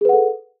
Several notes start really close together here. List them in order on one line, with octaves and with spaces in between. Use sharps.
G#4 B4 F#5 A4